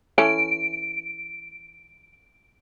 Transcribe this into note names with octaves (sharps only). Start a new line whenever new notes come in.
E3 C#4 A4 D7